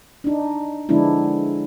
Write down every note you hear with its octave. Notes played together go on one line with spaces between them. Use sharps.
D4 D#4
D3 F3 G#3 B3 D4 E4